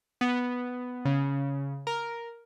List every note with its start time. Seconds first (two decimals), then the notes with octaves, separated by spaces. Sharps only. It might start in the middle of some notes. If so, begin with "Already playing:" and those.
0.21 B3
1.05 C#3
1.87 A#4